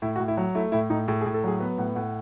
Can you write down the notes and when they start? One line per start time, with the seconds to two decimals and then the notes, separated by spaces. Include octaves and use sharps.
0.02 A2 E4
0.16 F#4
0.20 A2
0.28 E4
0.37 F#3
0.55 A3 E4
0.72 A2 E4
0.90 A2 D#4
1.08 A2 G#4
1.21 G#4
1.26 A2
1.34 A4
1.44 F#3 G#4
1.60 B3 B4
1.78 A2 F#5
1.95 A2 F#5